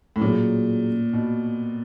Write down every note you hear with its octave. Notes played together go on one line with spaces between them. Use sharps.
A2
A#2 F#3 A#3 C#4 F4 G#4
B2